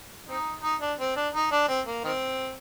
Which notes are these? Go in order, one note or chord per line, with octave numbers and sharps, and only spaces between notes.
C4 D#4
D#4
D4
C4
D4
D#4
D4
C4
A#3
D#3 C4